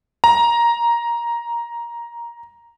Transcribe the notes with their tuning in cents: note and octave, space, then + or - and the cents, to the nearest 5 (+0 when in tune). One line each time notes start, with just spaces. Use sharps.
A#5 +5